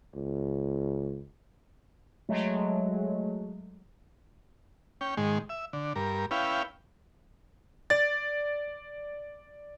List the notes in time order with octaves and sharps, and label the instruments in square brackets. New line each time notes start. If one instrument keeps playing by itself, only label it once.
[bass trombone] C#2
[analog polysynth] F#3 G#3 A3
[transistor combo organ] C#4 G5
G#2 D#3 G#3
E5
D3
G2 A#4
C#4 E4 B4 F5 G5
[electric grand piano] D5 A6